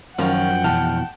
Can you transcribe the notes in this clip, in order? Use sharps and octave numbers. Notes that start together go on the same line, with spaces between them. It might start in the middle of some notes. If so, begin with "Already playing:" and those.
F#2 D#3 F3 C#4 F4 F#5 G5
F2 B2 E3 A5 F6